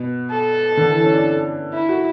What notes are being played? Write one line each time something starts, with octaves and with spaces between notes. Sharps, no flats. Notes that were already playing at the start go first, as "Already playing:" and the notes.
Already playing: B2
A4
D3
E3
C#4
D4
E4
F#4